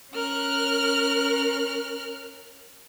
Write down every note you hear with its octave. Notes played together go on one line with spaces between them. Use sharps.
C#4 A#4 F6 F#6